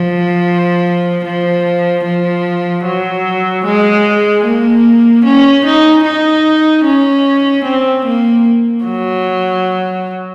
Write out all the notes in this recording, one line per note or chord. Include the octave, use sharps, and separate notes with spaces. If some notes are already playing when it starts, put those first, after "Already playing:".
Already playing: F3
F3
F3
F#3
G#3
A#3
C#4
D#4
D#4
C#4
C4
A#3
F#3